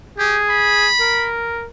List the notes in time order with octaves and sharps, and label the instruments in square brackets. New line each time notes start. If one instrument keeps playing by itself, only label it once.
[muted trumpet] G4 [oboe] G#4
[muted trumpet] B5
[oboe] A#4